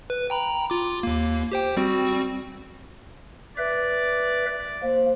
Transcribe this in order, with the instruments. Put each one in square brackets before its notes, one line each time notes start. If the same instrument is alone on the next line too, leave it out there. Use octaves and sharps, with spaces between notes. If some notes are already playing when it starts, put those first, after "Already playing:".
[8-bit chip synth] B4
G5 A#5 B5
F4 D6
D#2 A#3
G4 C5 G5
G3 C4 F#4
[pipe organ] B4 E5 [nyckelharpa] D5
[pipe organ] A#3 [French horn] C5